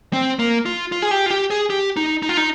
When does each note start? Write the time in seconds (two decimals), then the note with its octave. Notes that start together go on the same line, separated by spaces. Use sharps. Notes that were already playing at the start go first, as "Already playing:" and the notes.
0.13 C4
0.39 A#3
0.66 F4
0.92 F4
1.02 G#4
1.11 G4
1.26 F4
1.30 G4
1.50 G#4
1.70 G4
1.97 D#4
2.23 D#4
2.29 F4
2.37 D#4